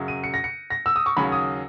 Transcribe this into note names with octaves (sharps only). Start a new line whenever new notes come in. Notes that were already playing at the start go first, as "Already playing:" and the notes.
Already playing: F#2 C#3 F#3
D#7
C#7
A#6
C#7
A#6
E6
D#6
C#6
D#2 C#3 F#3 C#4 B5
D#6